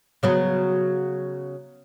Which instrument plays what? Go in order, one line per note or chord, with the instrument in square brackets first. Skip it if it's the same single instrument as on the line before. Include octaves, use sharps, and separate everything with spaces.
[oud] C#3 F#3 B3